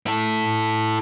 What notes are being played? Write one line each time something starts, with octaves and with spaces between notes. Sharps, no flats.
E4 A4